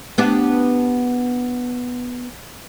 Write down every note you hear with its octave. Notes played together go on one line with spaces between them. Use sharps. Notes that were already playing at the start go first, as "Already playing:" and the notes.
B3 D4 G4